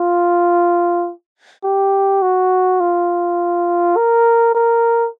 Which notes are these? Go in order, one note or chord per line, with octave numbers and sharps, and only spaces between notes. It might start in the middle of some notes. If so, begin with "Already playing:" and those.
Already playing: F4
G4
F#4
F4
A#4
A#4